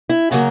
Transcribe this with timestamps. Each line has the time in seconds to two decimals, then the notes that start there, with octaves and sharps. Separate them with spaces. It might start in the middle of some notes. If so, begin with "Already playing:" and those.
0.09 E4
0.31 C#3 F#3 A#3 F#4